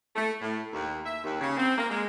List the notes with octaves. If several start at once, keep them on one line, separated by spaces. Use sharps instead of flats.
A3
A2
D#2
E5
D#2
C#3
C4
A#3
G#3